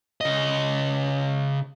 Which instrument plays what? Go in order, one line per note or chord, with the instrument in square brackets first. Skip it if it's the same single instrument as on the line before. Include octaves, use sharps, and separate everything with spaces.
[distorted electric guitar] C#3 D#5